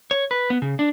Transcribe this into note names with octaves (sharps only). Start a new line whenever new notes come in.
C#5
B4
B3
C#3
D4